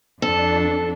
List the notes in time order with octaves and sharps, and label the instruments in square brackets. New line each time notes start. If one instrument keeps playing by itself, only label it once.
[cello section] F2 D4 [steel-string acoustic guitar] A4